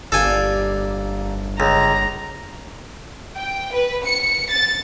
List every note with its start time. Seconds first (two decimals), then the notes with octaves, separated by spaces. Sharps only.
0.12 G1 G3 A#3 D4 A4 G#5
1.60 C#2 A#5
3.36 G5
3.72 B4
4.05 C#7
4.50 A6